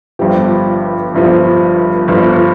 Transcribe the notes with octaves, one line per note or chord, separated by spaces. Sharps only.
G1 G2 F3 G4
G1 G2 F3
G1 G2 F3